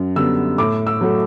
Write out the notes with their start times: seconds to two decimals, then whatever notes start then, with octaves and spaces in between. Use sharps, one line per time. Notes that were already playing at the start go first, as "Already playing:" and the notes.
Already playing: F#2
0.16 D3 G3 B3 E6
0.58 A2 D6
0.87 E6
1.01 F#3 A3